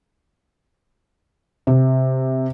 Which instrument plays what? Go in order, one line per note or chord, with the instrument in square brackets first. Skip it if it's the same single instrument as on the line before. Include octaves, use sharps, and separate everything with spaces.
[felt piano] C3